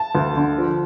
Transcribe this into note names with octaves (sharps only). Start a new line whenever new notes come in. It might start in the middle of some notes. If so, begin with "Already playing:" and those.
Already playing: A5
D2
D3
F3